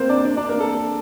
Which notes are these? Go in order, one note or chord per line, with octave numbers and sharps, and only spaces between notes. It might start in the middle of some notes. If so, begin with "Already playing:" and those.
Already playing: A#3 C4 A#4 C5
D4 D5
D4 D5
D4 D5
A#3 A#4
A4